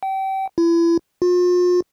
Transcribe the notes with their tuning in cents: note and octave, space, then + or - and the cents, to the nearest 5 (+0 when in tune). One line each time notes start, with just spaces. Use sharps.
G5 -30
E4 +35
F4 +40